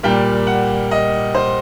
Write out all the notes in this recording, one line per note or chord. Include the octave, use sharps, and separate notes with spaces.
A#2 G3 A#3 G5
F#5
D#5
C5